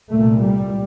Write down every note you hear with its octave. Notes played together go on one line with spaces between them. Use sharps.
C2 A#2 A3
G3